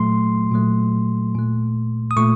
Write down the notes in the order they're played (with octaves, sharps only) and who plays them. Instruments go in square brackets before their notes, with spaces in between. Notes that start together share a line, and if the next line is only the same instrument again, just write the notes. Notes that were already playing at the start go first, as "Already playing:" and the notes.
Already playing: [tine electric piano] A#2 F#3 A3 C6
A#2 F#3 A3
A#2 A3
D#6
A#2 A3 C#6